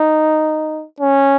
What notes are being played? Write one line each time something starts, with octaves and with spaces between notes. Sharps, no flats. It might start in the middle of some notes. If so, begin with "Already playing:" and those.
Already playing: D#4
C#4